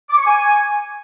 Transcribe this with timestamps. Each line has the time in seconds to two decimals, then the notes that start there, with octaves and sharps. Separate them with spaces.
0.10 D6
0.18 C#6
0.26 G#5